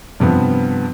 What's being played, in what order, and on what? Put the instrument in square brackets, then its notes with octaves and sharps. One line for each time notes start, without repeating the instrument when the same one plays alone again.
[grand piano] G2 C3 F3 B3